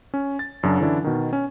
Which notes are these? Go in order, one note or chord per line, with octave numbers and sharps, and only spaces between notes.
C#4
A6
F#2 C#3 F#3 D4
D3 E3 C#4 D4 E4
B2 D#3
C#4